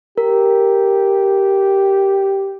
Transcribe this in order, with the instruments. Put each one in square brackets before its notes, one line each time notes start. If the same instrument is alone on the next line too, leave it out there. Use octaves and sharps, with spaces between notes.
[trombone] G4 [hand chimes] A#4